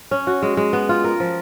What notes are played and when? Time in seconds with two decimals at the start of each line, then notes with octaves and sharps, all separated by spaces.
0.11 C#4
0.27 F#4
0.42 G#3
0.57 G#3
0.73 B3
0.89 F4
1.04 A#4
1.20 F3